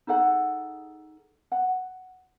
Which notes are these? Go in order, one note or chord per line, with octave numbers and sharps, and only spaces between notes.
D#4 G#4 A4 F#5
F#5